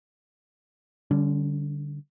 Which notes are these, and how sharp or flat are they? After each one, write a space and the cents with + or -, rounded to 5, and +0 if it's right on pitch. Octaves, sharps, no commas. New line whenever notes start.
D3 +0 G3 -5 C#4 +30